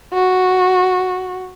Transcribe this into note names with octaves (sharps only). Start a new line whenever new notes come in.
F#4